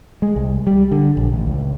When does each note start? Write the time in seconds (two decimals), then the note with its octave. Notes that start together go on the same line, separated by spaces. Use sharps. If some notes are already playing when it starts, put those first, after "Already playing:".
0.22 G#3
0.36 C2
0.67 G3
0.91 D3
1.17 A#1
1.32 A1
1.47 C#2